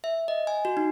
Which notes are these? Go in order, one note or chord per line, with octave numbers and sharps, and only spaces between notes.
E5
D#5
G#5
F#4
D#4